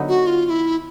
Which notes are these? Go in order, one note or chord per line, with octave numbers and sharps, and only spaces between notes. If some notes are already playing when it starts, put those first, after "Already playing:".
Already playing: D3 F#3 B3 D#4
F#4
F4
F4
E4